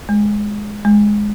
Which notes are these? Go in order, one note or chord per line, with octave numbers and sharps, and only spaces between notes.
G#3
G#3